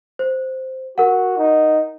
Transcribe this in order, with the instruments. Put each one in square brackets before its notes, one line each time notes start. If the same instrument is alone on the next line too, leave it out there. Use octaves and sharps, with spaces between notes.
[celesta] C5
[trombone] F#4 [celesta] A#4 F#5
[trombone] D#4